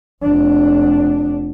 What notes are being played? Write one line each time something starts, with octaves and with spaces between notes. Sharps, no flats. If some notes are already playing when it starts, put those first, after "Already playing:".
F1 D4